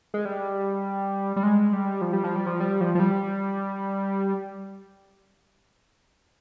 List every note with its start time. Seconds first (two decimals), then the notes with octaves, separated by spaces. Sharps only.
0.14 G#3
0.25 G3
1.36 G3
1.43 G#3
1.73 G3
2.01 F3
2.13 G3
2.24 F3
2.36 G3
2.47 F3
2.60 G3
2.81 F3
2.95 F3
3.00 G3